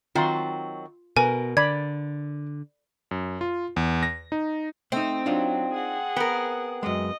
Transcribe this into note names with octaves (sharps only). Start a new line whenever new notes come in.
D#3 F#3 C4 F4 C6
B2 A#4 B4 G#5
D3 D5 B5 G#6
F#2
F4
E2
A#6
D#4
A3 C4 D#4
F#3 D4 D#4 F4
G#4 F#5
B3 A#4 G5
F#2 G#3 D#5